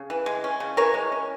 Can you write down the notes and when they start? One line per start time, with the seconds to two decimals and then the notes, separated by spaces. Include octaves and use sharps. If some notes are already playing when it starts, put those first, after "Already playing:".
Already playing: C#3
0.10 E3
0.26 G#3
0.44 C#4
0.60 C#3
0.77 E3 A#4 C#5
0.94 G#3
1.12 C#4